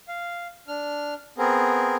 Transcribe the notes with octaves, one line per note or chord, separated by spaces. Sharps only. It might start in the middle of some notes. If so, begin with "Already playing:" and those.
F5
D4 F6
B3 C4 G#4 A#4